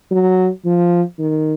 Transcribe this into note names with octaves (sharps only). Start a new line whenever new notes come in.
F#3
F3
D#3